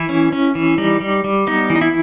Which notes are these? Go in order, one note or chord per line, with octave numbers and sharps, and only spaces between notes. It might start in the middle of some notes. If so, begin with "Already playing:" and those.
Already playing: E3 E4
C#4
C#4
E3
G3 D#4
G3
G3
B3 D#4
E3
D#4
E4